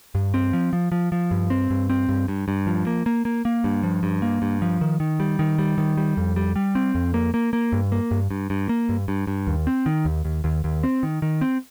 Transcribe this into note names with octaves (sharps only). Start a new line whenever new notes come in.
G2
C4
F3
F3
F3
F3
G2
C4
G2
C4
G2
G2
G2
F3
A#3
A#3
A#3
A#3
G2
F3
G2
A#3
G2
F3
D#3
D#3
G3
D#3
G3
D#3
G3
F2
G3
G3
C4
F2
A#3
A#3
A#3
G2
A#3
G2
G2
G2
A#3
G2
G2
G2
D#2
C4
D#3
D#2
D#2
D#2
D#2
C4
D#3
D#3
C4